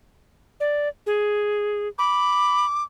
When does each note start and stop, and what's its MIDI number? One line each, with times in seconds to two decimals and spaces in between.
0.60 0.88 74
1.06 1.88 68
1.98 2.65 83
1.98 2.84 86